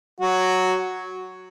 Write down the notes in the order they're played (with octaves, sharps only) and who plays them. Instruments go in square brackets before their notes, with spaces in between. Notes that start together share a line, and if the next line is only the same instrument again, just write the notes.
[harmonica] F#3 F#4